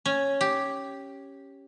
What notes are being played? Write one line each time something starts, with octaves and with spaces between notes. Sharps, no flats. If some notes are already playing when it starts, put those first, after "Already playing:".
C#4
G4